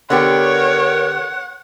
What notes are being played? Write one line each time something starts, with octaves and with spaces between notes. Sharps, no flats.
D3 B3 G4 A#4 C#5 F#5